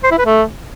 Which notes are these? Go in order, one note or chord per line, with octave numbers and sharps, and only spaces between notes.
C5
E4
B4
A3